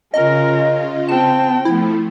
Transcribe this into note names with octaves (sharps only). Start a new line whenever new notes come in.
C#3 C#4 F4 A#4 D#5
C4 G5 A5
F3 A3 E4